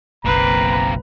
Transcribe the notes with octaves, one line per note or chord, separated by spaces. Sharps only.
F#1 B1 A#3 C4 B4 A#5